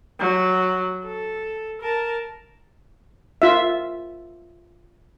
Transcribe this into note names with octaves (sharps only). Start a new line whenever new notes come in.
F#3
A4
A#4 A5
F4 E5